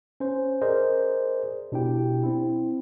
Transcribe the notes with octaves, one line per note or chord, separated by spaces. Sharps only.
C#4 C5
G#4 A#4 C5 D5 D#5
B2 D4 E4 G4 G5
C4 E4